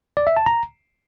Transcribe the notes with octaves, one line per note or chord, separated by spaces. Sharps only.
D5
E5
A5
A#5